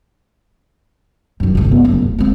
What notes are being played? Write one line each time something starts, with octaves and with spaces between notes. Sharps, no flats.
F#2 D#3
G#1 C#2
B3
F#1
D1
G#3 C4